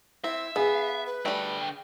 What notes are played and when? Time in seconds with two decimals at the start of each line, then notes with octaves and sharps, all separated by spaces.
0.24 C4 E4 E5
0.56 B3 G#4 F5
1.06 B4
1.25 D3 G3 A3 G5